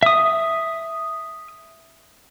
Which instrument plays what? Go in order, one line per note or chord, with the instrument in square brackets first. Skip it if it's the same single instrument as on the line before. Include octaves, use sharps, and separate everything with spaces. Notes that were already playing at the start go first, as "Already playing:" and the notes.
[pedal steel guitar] E5 D#6